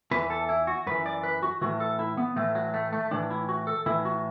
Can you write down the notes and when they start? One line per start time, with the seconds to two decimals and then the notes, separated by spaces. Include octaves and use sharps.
0.11 E2 E3 B4
0.22 B4
0.30 A4
0.49 E4
0.67 F#4
0.87 F#2 E3 B4
1.06 D5
1.23 B4
1.43 F#4
1.61 A2 E3 F#4
1.80 A4
1.99 E4
2.17 B3
2.36 A2 E3 A3
2.55 F#3
2.74 A3
2.93 A3
3.11 A2 E3 D4
3.31 E4
3.49 F#4
3.67 A4
3.86 A2 E3 E4
4.05 F#4